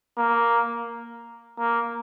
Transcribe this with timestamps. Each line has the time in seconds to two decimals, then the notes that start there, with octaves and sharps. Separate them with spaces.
0.18 A#3
1.59 A#3